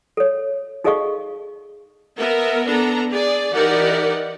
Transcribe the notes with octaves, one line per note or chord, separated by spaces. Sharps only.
A4 C#5
D#4 G#4 A4 D#5 F5 C#6
B3 A#4 E5
B3 D4 A4 A#5
G#4 D5
E3 D#4 G4 A#4 D5 F#5